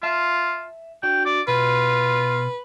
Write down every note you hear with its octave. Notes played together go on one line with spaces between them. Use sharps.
F4 E5 A5
D4 F#4 G5
D5
B2 F4 B4